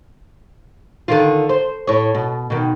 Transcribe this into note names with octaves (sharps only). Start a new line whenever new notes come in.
D3 D#3 F4
C5
A2 C#5
B2
B2 D#3